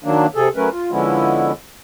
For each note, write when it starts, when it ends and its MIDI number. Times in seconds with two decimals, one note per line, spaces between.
0.04 0.26 51
0.04 0.26 54
0.04 0.26 58
0.04 0.26 62
0.35 0.49 48
0.35 0.49 68
0.35 0.49 69
0.56 0.69 54
0.56 0.69 57
0.56 0.69 61
0.56 0.69 70
0.56 0.69 71
0.72 0.91 65
0.91 1.52 50
0.91 1.52 53
0.91 1.52 56
0.91 1.52 59
0.91 1.52 61
0.91 1.52 64